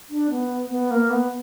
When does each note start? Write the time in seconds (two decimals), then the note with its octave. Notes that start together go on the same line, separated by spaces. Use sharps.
0.10 D4
0.30 B3
0.70 B3
0.91 A#3
1.10 B3